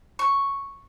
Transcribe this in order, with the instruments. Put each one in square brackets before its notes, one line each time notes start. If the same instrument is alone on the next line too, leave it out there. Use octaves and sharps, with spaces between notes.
[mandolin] C#6